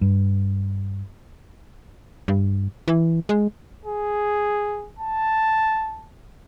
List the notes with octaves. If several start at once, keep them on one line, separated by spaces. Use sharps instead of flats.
G2
G2
E3
G#3
G#4
A5